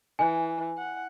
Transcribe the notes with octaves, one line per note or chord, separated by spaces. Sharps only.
E3 G#5
F#5